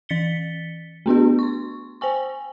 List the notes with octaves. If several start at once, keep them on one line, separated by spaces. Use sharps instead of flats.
E3 A6 B6 C#7 G7
A3 B3 D4 F#4
C6 C#6
C5 G5 G#5 C#6